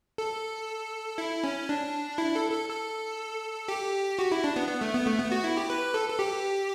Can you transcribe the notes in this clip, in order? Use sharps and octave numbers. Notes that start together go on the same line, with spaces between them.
A4
E4
C#4
D4
E4
A4
A4
A4
G4
F#4
E4
D4
B3
B3
A3
B3
A3
B3
F#4
E4
G4
B4
A4
A4
G4